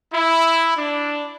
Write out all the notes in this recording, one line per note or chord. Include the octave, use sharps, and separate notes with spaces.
E4
D4